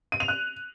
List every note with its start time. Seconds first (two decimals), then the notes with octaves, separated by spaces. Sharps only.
0.12 D#7
0.20 F7
0.28 F#6